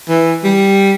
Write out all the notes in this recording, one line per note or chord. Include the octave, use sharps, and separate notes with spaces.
E3
G3